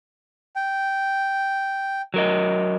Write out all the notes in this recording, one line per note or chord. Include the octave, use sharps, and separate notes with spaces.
G5
F#3 A#4 D#5